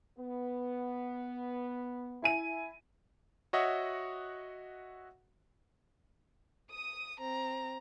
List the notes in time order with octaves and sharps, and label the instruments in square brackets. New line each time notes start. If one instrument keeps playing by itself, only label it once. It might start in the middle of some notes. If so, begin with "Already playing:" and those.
[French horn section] B3
[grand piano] E4 G#5 D#7
[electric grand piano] F#4 C#5 D#5 E5 F#5
[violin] D#6 D#7
C4 A#5